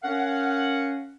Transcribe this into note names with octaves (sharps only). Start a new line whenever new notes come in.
C#4 A#4 F5 F#5